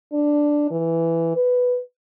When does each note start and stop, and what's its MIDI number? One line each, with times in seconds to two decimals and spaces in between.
0.13 0.67 62
0.71 1.31 52
1.36 1.80 71